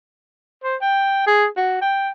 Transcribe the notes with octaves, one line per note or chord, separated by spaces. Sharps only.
C5
G5
G#4
F#4
G5